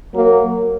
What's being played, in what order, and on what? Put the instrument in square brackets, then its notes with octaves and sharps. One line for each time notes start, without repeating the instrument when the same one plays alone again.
[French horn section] F#3 A#3